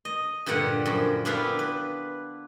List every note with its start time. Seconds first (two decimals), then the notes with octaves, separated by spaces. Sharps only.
0.05 D#5
0.46 G2 A#2 D3 G3 F#5
0.86 F#2 F3
1.25 B3 D4 E4 F4 G4 F5
1.59 B4